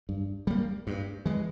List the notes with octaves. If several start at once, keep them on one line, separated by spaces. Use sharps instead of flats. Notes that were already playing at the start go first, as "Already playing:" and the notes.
G2
G3 A#3
G2
E3 G#3